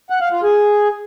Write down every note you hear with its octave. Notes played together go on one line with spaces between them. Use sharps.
F#5
F5
F4
G#4